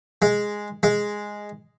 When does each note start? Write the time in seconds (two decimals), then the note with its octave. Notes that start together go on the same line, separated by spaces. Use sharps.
0.22 G#3
0.83 G#3